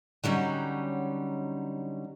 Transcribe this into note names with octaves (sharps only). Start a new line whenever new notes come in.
D3 F#3 G3 C#4 D#4